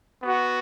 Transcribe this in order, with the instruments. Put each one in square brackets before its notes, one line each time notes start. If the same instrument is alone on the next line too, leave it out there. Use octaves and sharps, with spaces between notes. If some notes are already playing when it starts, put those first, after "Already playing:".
[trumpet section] B3 F#4